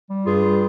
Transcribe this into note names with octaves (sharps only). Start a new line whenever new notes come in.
G3
G2 F4 G#4
G3